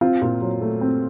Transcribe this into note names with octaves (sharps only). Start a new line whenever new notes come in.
C4 F4
A#2
F#3
A3
C4